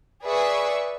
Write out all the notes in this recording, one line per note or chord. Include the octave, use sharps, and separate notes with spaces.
G#4 B4 D5 E5 C#6